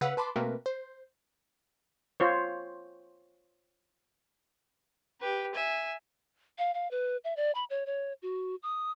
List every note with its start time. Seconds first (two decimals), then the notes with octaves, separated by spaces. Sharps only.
0.01 C#3 B4 F5 F#5 E6
0.17 B4 A5 B5 C6 D6
0.36 B2 A3 A#3 C4 A#4 B4
0.66 C5
2.20 F4 C5 C#5
5.21 G4 B4
5.55 E5 G#5
6.58 F5
6.74 F5
6.91 B4
7.24 E5
7.37 D5
7.55 B5
7.70 C#5
7.86 C#5
8.22 F#4
8.63 D#6